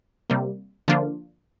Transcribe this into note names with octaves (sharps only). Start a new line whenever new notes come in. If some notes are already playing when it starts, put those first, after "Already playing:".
C3 G3 A#3
D3 F3 A#3 D4 F4